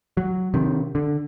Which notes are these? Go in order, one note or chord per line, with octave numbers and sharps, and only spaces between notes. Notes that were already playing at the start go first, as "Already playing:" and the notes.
F#3
C3 D#3
D3